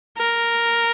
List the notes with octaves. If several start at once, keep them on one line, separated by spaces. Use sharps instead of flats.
A#4